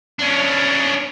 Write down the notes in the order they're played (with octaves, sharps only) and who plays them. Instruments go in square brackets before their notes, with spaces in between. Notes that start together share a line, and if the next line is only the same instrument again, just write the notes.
[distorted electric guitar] C#4 D4